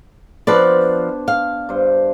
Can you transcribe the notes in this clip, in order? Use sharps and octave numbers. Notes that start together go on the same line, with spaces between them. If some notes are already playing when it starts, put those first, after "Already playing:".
F3 B3 D4 B4 C5 D5
F5
G2 C5